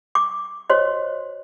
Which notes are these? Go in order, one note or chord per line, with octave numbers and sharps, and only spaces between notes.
D6
F#4 C5 C#5 D#5